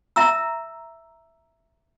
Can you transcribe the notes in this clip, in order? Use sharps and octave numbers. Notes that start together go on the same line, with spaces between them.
E5 A#5 E6